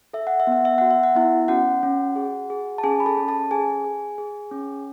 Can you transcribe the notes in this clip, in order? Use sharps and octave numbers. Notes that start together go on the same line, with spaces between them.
A4 E5
F#5
E5
B3
F#5
E5
F#4 F#5
E5
F#5
B3 E4 E5
C#4 F#4 F#5
C#4
G#4
G#4
A5
C#4 G#4 G#5
B5
A4 A5
C#4
A4 A5
G#4 G#5
G#4
G#4
C#4